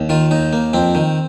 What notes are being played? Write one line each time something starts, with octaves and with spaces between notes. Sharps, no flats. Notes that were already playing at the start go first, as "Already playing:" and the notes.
Already playing: D#2
D#3 F4
D#2 D#4
A#3
F2 C4
D#3